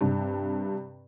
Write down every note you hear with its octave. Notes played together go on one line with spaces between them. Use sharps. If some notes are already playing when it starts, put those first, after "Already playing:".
G2 C3